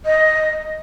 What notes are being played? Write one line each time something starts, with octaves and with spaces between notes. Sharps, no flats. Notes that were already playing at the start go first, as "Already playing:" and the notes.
D#5